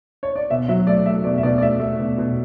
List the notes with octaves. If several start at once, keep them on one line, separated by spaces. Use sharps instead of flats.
C#5
D5
B2 E5
F#3 E5
A3 D5
A3 E5
B2 D5
E5
B2 D5
D5
A3 E5
A3
B2
B2